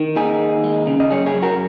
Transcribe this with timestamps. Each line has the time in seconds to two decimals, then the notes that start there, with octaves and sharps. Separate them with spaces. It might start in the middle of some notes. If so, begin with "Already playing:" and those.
Already playing: D#3
0.16 D#2 D#4 G#4
0.40 D#2
0.64 G#3
0.87 C#3
1.00 D#5
1.11 F#2 G#4 C#5
1.26 G#4 C#5
1.35 F#2
1.42 F#4 A#4